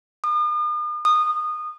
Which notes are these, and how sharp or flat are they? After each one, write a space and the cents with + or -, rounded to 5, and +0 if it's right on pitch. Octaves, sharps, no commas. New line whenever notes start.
D#6 -45
D#6 -20